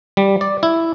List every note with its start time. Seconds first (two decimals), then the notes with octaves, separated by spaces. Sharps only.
0.17 G3
0.41 D5
0.63 E4